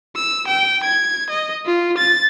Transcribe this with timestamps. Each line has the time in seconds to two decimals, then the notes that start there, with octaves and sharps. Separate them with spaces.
0.16 E6
0.48 G5
0.84 G#6
1.30 D#5
1.66 F4
1.98 A6